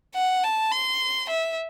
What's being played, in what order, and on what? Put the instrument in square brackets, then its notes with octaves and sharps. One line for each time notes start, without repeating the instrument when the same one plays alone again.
[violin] F#5
A5
C6
E5